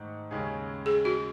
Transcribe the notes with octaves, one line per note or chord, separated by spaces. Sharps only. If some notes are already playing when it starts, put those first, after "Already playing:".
Already playing: G#2 D#3 A3
D#2 C#3 G#3 C#4 G#4
G#4
F#4